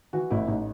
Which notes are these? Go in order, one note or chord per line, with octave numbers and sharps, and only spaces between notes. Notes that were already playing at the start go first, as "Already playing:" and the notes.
E3 F#4
A1 E4
A1 D#4